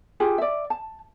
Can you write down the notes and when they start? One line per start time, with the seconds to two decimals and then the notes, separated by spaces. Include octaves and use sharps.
0.20 F4 G4 G#4
0.38 D5 E5
0.70 A5